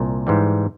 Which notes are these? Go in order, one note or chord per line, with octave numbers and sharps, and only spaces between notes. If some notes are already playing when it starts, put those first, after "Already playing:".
Already playing: C2 A#2
G#2 E3 G3